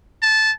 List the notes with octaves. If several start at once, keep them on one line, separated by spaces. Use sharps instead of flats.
A5